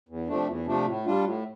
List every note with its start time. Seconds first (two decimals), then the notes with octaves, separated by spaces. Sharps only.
0.09 E2
0.28 C3 F3 A3 D4
0.47 E2
0.66 C3 F3 A3 D4
0.86 A2
1.06 G3 D4 F4
1.24 A2